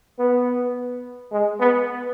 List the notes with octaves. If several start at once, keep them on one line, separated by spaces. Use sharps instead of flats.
B3
G#3
B3